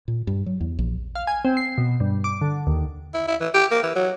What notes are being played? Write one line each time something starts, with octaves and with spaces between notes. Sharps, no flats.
A#2
G2
F#3
E2
A#1
F5
G#5
C4
C7
B2
G2
D6
D3
D#2
E4
E4
E3
G4
A#3
E3
F#3